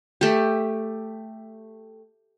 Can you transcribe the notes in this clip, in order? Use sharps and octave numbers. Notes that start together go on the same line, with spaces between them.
A3 G4